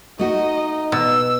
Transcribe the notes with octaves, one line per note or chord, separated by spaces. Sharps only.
A3 D#4 F#4 D#5
B2 E6